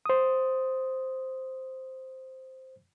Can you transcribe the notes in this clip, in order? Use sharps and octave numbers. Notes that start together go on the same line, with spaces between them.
C5 D#6